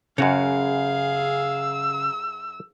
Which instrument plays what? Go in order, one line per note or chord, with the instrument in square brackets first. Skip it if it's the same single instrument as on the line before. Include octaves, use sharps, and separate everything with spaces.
[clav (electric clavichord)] F#2 F#4 C#5 [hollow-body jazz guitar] C#3 [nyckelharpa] G#4 F5
[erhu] E6